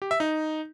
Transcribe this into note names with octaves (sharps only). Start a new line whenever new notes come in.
G4
E5
D#4